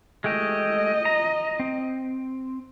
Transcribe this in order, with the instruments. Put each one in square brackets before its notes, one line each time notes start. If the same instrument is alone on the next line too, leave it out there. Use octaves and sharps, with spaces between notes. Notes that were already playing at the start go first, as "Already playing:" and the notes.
[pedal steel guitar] G#3 A3 G4 [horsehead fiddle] D#5
[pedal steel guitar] A#5
C4